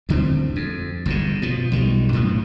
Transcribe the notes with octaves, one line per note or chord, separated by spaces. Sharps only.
D2 D3 G3 C4
F2
G1 F#2 A2 C#3
B2 F3
B1 D#3 F#3 G3
F#2 A2 D#3 F3